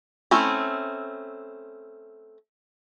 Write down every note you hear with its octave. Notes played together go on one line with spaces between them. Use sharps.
A3 C4 C#4 E4